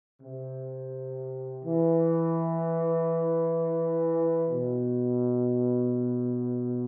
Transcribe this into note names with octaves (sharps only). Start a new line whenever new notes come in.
C3
E3
B2